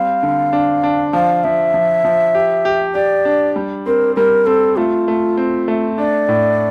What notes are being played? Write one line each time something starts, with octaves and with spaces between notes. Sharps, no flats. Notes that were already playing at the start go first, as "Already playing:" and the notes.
Already playing: G3 C4 F5
D3
D4
D4
F3 F5
F3 E5
F3
F3
G4
G4
G4 D5
D4
G3
C4 A#4
G3 A#4
C4 A4
A3 F4
A3
C4
A3
D4 D5
A2